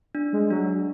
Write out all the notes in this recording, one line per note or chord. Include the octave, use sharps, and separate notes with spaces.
D4
G#3
F#3 D4